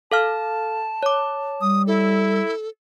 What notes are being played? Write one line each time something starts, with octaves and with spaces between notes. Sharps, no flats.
A4 F5 A5 F6
C#5 D6
G3 D#6
E4 A4